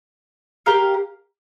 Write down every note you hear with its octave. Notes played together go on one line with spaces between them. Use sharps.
G4 A#4 F5